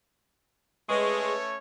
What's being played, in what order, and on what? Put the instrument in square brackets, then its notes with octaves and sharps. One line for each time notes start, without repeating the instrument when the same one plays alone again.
[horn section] G#3 [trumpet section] A3 C#4 C#5 [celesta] B4 C#6